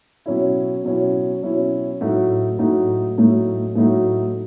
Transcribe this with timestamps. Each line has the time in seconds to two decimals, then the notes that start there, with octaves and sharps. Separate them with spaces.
0.26 B2 F#3 C#4 E4
0.84 B2 F#3 C#4 E4
1.43 B2 F#3 C#4 E4
2.01 A2 F#3 A3 D#4 F#4
2.59 A2 F#3 A3 D#4 F#4
3.17 A2 F#3 A3 D#4 F#4
3.75 A2 F#3 A3 D#4 F#4